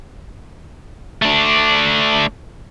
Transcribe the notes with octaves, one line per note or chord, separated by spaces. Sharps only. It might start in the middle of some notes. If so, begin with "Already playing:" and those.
A3 D4